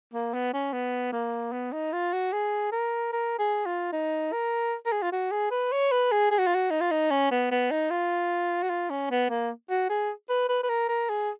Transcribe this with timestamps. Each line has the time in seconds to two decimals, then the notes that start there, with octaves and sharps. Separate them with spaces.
0.14 A#3
0.34 B3
0.53 C#4
0.73 B3
1.12 A#3
1.52 B3
1.73 D#4
1.93 F4
2.13 F#4
2.33 G#4
2.72 A#4
3.13 A#4
3.39 G#4
3.66 F4
3.92 D#4
4.32 A#4
4.86 A#4
4.92 G#4
5.02 F4
5.12 F#4
5.31 G#4
5.51 B4
5.72 C#5
5.91 B4
6.12 G#4
6.31 G#4
6.38 F#4
6.47 F4
6.55 F#4
6.70 D#4
6.80 F4
6.91 D#4
7.11 C#4
7.31 B3
7.51 B3
7.71 D#4
7.90 F4
8.63 F#4
8.69 F4
8.90 C#4
9.10 B3
9.29 A#3
9.70 F#4
9.89 G#4
10.29 B4
10.49 B4
10.63 B4
10.69 A#4
10.89 A#4
11.09 G#4